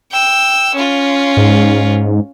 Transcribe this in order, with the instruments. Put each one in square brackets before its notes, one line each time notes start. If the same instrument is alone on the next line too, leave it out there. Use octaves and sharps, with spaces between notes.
[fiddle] G5 E6
C#4 F4
[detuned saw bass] G#2